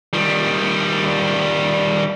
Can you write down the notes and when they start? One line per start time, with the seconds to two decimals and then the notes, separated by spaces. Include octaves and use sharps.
0.13 D#3 G3